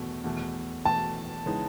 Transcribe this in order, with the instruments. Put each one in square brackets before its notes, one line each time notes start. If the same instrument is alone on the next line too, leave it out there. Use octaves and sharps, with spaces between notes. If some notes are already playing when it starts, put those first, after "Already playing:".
Already playing: [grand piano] E2 B2 A3
E2 B2 A3
[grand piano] E2 B2 A3 [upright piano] A5
[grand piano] C#3 E3 G#3 B3 D#4